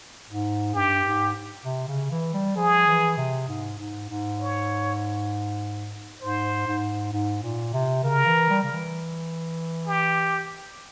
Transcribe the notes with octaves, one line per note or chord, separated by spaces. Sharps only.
G#2
G2 G4
G#2
C3
C#3
E3
G3
F3 G#4
E3
C3
G#2
G#2
G#2
C#5
G#2 C5
G#2
G#2
A#2
C3
C#3 A#4
E3
G3
C#3
E3
G4